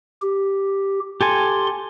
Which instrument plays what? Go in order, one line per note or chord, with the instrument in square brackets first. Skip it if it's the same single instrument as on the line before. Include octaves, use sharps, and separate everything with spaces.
[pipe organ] G4
[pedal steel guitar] G4 A4 G#5 [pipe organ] C6